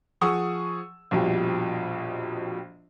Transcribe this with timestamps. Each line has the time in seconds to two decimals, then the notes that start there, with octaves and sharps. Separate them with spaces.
0.21 F3 G#4 F#5 C#6 D#6 E6
1.11 A#1 F2 B2 G3